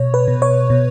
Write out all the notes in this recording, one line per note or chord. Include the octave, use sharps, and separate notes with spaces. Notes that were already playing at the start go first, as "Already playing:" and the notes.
Already playing: B2 C#5
B4
B2
C#5
B2